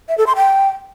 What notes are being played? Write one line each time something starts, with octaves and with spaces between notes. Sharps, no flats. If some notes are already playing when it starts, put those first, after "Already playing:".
E5
A4
C6
G5